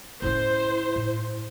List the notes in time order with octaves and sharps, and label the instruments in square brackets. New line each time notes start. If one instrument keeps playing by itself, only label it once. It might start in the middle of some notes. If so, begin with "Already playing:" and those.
[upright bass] A2 C#4 [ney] E4 [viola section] C5
[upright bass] A2